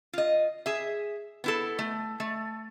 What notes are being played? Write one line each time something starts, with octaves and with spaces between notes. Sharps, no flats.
F4 D#5
G#4 E5
B3 E4 A4
A3
A3